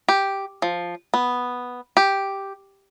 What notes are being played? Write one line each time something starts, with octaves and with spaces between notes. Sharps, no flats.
G4
F3
B3
G4